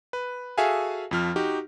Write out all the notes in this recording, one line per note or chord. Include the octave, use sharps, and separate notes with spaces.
B4
F#4 G#4 A4 E5 F5 G#5
F2 F3 F6
D#4 F#4 G4